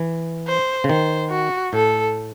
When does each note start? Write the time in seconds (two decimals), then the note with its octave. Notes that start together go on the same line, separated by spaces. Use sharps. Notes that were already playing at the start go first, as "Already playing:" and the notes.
Already playing: E3
0.47 C5
0.84 C#3
0.89 D#3 C5
1.31 F#4
1.73 A2 A4